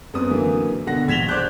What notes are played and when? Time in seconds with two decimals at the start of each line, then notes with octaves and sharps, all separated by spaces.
0.14 F#2 B3 C4 D#6
0.30 D3 E3 F#3 A#3
0.87 B2 D3 F#5 A#6
1.08 A#1 G#6 B6 E7 F7 G7
1.28 C5 D5 D6 F#6 G6